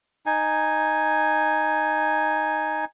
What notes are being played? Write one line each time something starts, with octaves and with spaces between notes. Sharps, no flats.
D#4 G#5